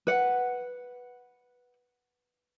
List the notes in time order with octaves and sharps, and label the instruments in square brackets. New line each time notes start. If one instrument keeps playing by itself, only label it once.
[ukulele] B4 F#5